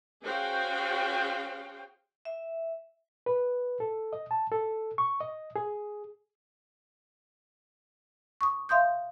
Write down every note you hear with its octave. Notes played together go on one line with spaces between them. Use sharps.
C#4 F#4 G#4 C5 F5 G5
E5
B4
A4
D#5
A5
A4
C#6
D#5
G#4
C#6 D#6
E5 F5 C6 D#6 G6